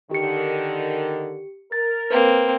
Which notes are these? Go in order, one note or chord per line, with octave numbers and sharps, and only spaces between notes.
D3 D#3 G4 C#7
A#4 A6
A#3 C4 B4